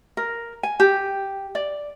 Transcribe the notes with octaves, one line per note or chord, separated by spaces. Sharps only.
A#4
G#5
G4
D5